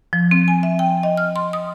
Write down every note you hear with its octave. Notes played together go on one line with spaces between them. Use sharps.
F3
C4
G#5
E5
G5
D#5
F6
C6
D#6